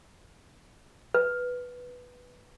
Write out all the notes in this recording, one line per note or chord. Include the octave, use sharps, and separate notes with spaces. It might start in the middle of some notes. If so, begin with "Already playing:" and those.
B4